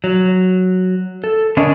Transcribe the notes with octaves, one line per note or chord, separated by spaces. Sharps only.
F#3
A4
D3 C#4 D4 A#4 D#5